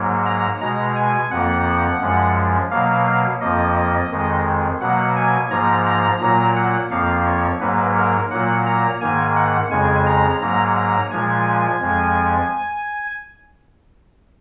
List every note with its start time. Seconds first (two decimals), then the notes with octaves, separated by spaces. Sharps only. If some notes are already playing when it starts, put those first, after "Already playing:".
Already playing: G#2 F#3 A#3
0.26 A#5
0.61 B2 G#3 A#5
0.96 G#5
1.31 F2 F3 A#3 F#5
2.01 F#2 F3 G#3
2.71 B2 F#3 A#3 F5
3.41 F2 F3 A#3 D#5
4.11 F2 D#3 G#3
4.81 B2 F#3 A#3 F#5
5.16 G#5
5.51 G#2 F3 A#3 A#5
5.86 A#5
6.21 A#2 F#3 A#3 A#5
6.56 F#5
6.91 F2 F3 A#3 F5
7.26 C#5
7.61 G#2 F#3 A#3 B4
7.96 A#4
8.31 A#2 F#3 A#3 F#5
8.66 A#5
9.01 G#2 D#3 A#3 G#5
9.36 F#5
9.71 F2 C#3 G#3 G#5
10.06 A#5
10.41 G#2 F#3 A#3 A#5
10.76 A#5
11.11 A#2 F3 G#3 G#5
11.81 F2 F3 G#3